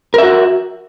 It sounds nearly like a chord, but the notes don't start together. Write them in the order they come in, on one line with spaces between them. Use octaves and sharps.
A#4 E5 F#4